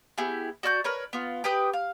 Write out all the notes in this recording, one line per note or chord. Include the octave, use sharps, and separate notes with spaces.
B3 E4 G4 G#4
F#4 D5 F6 G6
A#4 B4 C#5
B3 F4
G4 B4 G5 D#6
F5